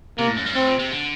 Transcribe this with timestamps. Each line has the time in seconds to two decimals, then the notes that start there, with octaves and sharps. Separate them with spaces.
0.18 C3 A#3
0.28 A2
0.37 F#2
0.46 G2
0.55 A2 C4
0.67 A#2
0.79 C3
0.92 D3